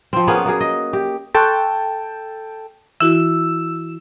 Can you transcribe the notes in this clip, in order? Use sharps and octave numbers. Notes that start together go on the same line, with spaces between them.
F3 C4
A#3 B3 C#4 G#4
A#3 F#4 G#4
D#5
G4
A4 G5 A5 C6 C#6 F#6
E3 E4 F#4 E6